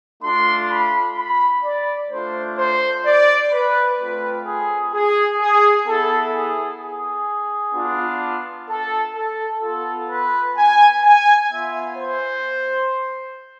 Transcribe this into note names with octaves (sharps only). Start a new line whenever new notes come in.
A3 D4 F4 C6
B5
B5
D5
A3 D4 F4 C5
C5
D5
B4
A3 C4 F4 B4
G#4
G#4
G#4
B3 E4 A4
G#4
G#4
B3 D4 F4
A4
A4
B3 F4 A4
B4
G#5
G#5
B3 F4 E5
C5